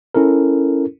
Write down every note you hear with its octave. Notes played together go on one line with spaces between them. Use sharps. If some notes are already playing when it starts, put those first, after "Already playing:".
C#4 E4 A4 A#4